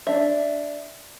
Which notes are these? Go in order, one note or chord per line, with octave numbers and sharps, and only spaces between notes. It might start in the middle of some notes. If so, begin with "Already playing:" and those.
D4 E5